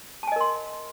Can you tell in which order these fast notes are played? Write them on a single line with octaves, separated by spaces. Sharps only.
A5 G#5 D#5 A#4 C6